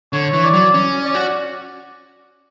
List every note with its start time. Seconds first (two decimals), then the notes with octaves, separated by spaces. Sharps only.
0.13 D3 C#5
0.33 E3
0.44 D5
0.54 F#3
0.74 C#4
1.05 D5
1.15 F#4